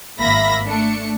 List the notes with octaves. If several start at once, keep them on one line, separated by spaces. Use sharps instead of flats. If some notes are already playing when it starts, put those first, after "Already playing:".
G#1 A#3 E5 B5 A#6
A3 D4 C#7